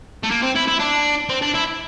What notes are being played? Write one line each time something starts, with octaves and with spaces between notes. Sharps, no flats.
A3
A#3
C4
E4
E4
D4
C4
D4
E4